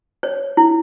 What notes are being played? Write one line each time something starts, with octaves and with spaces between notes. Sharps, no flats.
C#5
E4